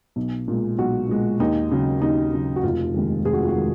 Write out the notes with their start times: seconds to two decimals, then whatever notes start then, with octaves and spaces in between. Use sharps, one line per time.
0.16 B1
0.48 A#2 G#3
0.78 B1 F#4
1.09 A#2 G#3
1.40 D#2 D#4
1.71 C#3 F#3
2.02 D#2 D#4
2.33 C#3 F#3
2.56 F#4
2.63 F1 F4
2.94 D#2 D#3 G#3
3.25 F1 G#4
3.33 F#4
3.41 F4
3.48 F#4
3.56 D#3 G#3